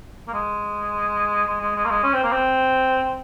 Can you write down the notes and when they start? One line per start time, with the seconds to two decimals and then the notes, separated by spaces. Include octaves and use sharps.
0.27 A#3
0.33 G#3
1.48 G#3
1.61 G#3
1.75 G#3
1.85 A#3
1.90 G#3
2.03 C#4
2.13 C4
2.24 A#3
2.32 C4